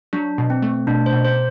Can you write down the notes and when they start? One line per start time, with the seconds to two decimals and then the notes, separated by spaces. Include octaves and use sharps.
0.13 F#3 D4
0.38 B2
0.50 C4
0.62 A3
0.87 B2 D4
1.06 C5
1.13 B2
1.25 C5